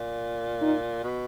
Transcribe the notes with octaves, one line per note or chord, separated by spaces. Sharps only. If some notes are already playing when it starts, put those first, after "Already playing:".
Already playing: A#2
D#4
B2